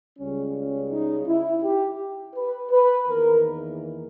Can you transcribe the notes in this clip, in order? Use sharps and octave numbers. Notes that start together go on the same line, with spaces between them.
C#2 C#3 G3 C#4
C#4
D#4
E4
G4
B4
B4
E2 D#3 A#3 A#4